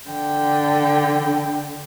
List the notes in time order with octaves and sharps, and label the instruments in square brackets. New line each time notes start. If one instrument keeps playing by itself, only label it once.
[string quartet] D3 G5